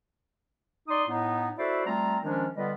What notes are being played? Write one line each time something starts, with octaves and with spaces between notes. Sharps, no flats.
D#4 D5 C6 D#6
A2 B3 D#4
E4 F#4 A4 C5 D5 E5
G3 A3 C4 F4 A#5
D#3 F3 G#3 C#4 D4
D3 G3 B3 F4 B4 D#5